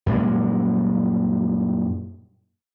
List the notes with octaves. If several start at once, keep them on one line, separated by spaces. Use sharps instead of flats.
F#2 A#2 G3 G#3